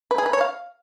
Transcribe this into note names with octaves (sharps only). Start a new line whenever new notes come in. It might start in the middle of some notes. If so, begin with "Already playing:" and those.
B4
G#4
B4
C#5
F5